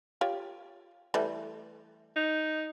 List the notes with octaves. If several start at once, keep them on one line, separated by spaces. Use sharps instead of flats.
F4 G4 C#5
E3 G3 A3
D#4